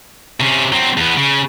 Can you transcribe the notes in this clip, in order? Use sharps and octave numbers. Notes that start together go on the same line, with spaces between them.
C3 C#4
F#3 C4
E2 B3
C#3